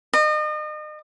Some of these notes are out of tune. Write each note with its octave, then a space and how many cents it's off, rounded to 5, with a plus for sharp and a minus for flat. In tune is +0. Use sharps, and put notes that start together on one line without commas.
D#5 -35